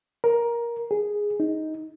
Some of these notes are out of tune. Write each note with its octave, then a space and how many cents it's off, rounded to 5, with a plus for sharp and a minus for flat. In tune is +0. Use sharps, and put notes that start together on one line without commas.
A#4 +15
G#4 -5
D#4 +10